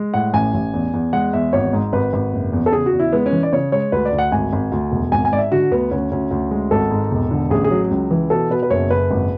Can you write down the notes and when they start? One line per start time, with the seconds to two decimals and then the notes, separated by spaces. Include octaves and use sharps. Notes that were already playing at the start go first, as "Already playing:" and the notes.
Already playing: G#3
0.14 A2 F#5
0.33 A1 G#5
0.54 A1
0.74 E2
0.94 E2
1.13 G#3 F#5
1.33 E2 E5
1.53 G#1 C#5
1.73 G#2
1.93 G#1 B4
2.13 G#1
2.33 F#1
2.53 E2
2.66 A4
2.72 C#3 G#4
2.86 F#4
2.93 E2
2.99 E4
3.13 G#3 B3
3.26 C#4
3.32 E3
3.43 D5
3.53 C#3 C#5
3.72 G#3 C#5
3.92 D2 B4
4.05 D5
4.13 D2
4.18 F#5
4.32 G#1 G#5
4.53 G#1
4.72 D2
4.92 E1
5.12 G#1 G#5
5.25 G#5
5.32 G#2 D5
5.38 E5
5.52 D3 F#4
5.71 D2 B3
5.91 D2 C#4
6.11 D2 C#4
6.31 D2
6.51 G#3
6.71 G#1 A4
6.91 G#2
7.11 E1
7.31 D3
7.50 A1 G#4
7.64 G#4
7.71 F#3
7.91 C#2
8.11 E3
8.30 B2 A4
8.50 B2 B4
8.63 B4
8.70 F#1 C#5
8.90 F#1 B4
9.11 G#1